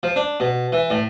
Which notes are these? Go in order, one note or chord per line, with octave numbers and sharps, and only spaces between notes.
F3
D4
B2
E3
A2